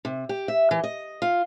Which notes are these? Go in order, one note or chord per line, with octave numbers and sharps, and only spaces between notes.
C3
G4
E5
E3
D#5
F4